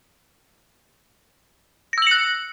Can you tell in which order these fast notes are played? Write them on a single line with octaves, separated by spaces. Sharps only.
A#6 E6 F#7 C#7 F#6